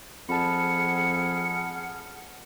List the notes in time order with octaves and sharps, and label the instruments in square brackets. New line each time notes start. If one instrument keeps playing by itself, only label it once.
[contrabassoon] F2 [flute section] G#4 F#5 F6 [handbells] A5 B5 [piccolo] C#7